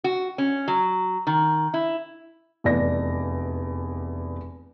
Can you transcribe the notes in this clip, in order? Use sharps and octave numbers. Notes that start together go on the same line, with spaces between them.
F#4
C#4
F#3
D#3
E4
F1 E2 D5 A#6